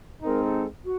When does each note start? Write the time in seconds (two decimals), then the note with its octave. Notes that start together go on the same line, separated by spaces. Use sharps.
0.22 G#3 C4 D#4 A#4
0.42 A4
0.83 F#4